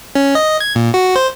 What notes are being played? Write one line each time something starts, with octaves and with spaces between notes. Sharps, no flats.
C#4
D#5
G#6
A#2
F#4
C5